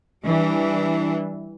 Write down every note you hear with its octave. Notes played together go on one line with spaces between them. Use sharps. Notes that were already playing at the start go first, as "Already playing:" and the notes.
E3 G3 D4